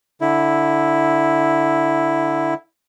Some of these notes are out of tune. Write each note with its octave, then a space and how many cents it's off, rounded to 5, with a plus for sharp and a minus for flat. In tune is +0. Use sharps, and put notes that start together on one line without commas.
D3 +0 E4 +0